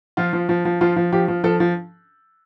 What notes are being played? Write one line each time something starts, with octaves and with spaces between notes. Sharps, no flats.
F3 F4
F3
F3
F3
F3 F4
F3
F3 G4
F3
F3 A4
F3